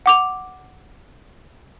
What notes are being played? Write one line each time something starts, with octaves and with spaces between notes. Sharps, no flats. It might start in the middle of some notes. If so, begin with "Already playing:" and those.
F#5 D6 F7